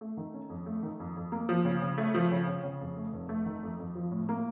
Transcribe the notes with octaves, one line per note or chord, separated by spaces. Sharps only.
A3
D#3
C#4
F2
A3
D#3
F2
F2
A#3
F3
C#3
C#3
A3
F3
C#3
C#3
C#3
F2
A3
F1
A3
D#3
F2
F2
F3
A2
A#3